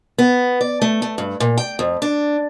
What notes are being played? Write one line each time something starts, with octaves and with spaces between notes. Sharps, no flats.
B3
D5
A3
A3
G2
A#2
G5
F2
D4